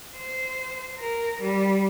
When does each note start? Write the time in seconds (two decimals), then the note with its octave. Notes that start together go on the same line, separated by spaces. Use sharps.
0.18 C5
0.99 A#4
1.41 G3